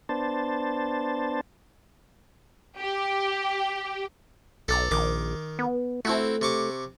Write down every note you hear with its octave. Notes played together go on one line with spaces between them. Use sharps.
B3 D4 C5 A5
G4
B1 A4 D5 A#5
A#1 D#3 D6
B3
A3 C4 E4 F#4
C3 C#6 D6